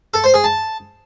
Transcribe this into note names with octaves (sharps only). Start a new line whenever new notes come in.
A4
C5
G#4
A5